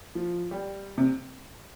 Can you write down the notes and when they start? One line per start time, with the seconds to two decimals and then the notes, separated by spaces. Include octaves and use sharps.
0.15 F3
0.51 G3
0.98 C3